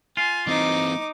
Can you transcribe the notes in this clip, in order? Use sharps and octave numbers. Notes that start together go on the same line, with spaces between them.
F4 G#5
E3 C4 D#4 D6